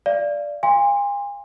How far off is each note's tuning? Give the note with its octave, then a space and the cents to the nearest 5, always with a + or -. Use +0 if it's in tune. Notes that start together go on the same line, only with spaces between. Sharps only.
D5 +0 F5 -30
F5 +0 G#5 -40 C6 +0